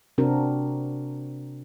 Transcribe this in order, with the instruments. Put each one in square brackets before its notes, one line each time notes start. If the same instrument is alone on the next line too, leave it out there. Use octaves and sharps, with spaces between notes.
[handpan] C3 C4 D4 F#4 A#4